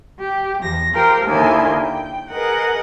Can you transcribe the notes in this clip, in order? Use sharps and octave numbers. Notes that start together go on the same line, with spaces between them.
G4
E2 F3 A#6
F4 G4 A#4 C5 G5
D#2 D3 E4 A#4 G#5 C6
G5
G#4 A#4 B4 D#5 F#5